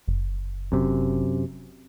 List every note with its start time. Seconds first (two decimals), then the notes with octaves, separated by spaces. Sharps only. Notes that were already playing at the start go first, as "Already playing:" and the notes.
0.08 F#1
0.72 F#2 C3